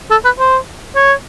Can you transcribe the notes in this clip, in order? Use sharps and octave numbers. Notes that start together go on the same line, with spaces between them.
A4
B4
C5
C#5